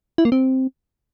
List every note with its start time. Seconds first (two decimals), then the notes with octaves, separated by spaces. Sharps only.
0.18 E4
0.25 A#3
0.32 C4